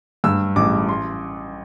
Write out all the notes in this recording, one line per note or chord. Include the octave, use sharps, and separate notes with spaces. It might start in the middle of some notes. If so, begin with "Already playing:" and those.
G2 E6
A1 D6
C6